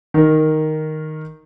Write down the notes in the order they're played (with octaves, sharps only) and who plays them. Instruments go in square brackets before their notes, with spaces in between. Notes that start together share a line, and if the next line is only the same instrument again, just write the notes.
[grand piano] D#3 A#4